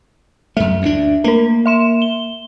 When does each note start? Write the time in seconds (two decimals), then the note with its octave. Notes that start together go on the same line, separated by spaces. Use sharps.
0.57 F#2 A3 E5
0.82 D2 B3 D4
1.24 A3 A#3 A#4
1.66 E5 C6 E7
2.02 G7